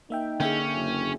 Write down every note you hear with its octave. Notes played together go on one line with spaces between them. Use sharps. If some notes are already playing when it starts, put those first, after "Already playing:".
A#3 D#4 E5 G5
D3 A#3 C#4 G#4 E5 G5
F#1